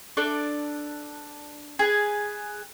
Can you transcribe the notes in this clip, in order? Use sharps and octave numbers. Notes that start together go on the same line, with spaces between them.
D4 A4 D5
G#4 B4